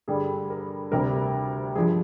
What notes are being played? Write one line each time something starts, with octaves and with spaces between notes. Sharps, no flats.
G2 D3 G3 G#4
A#4
D2 C3 G3 A#4
G2 F3 G#4